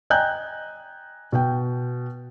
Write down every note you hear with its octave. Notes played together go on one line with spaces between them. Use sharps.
D#5 G5 G#5 A#5 F#6 G6
B2 G5